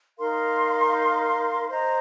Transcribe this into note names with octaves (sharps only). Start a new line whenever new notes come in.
D#4 A#4 F5 C6
C5 D#5 A#5